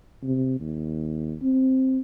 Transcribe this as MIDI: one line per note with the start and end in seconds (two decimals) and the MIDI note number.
0.23 0.60 48
0.60 1.36 39
1.42 2.01 60